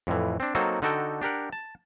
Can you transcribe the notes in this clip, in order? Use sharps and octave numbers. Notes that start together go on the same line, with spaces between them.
F2 A2 E3
C4 D4
F#3 A#3 C4 D#4 F#4 A4
D3 D#4 F#4 A4 G5
D4 G4 A#4 F#5
A5